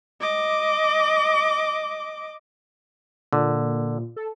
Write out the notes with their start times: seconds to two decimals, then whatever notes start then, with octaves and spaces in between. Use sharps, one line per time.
0.20 D#5 D6
3.33 A#2 D3
4.16 A4